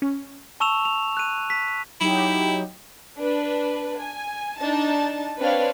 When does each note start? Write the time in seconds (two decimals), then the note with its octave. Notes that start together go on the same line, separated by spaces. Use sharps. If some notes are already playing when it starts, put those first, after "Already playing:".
0.02 C#4
0.60 A5 C#6 E6 E7 F7
0.85 F7
1.17 F#6 D#7
1.50 B6
2.01 F#3 D#4 E4 G4
3.17 D4 B4
4.00 G#5
4.60 D4 D#4 A5
5.39 C4 D4 B4 C#5 F5